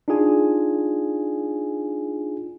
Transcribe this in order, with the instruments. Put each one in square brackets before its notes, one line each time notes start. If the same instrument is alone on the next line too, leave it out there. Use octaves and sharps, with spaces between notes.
[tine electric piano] D4 D#4 F4 G#4 G#5